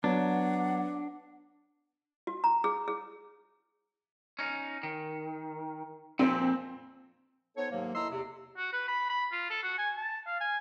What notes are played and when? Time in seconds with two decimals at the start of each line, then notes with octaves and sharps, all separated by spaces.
0.04 F#3 B3 D4 F#5
2.27 F#4
2.44 A#5
2.64 G#4
2.88 G#4
4.39 C#4 D#4
4.83 D#3
6.19 F2 A#2 C4
7.57 B3 D#4 A4 C5 C#5
7.71 G#2 C3 D#3 F#3 A#3
7.94 E4 A4 D#5 A#5 C6 E6
8.11 E2 C3
8.57 F#4
8.73 B4
8.88 B5
9.09 B5
9.32 F4
9.50 A4
9.63 F#4
9.78 G#5
9.96 A5
10.27 F5
10.40 G#5